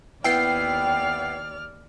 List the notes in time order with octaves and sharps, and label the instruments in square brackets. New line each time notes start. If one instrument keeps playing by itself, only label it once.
[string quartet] D#2 D5 F6 [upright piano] B3 E4 [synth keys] G5 C7